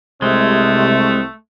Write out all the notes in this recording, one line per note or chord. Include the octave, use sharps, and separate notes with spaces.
C2 C3 G#3 A3 C4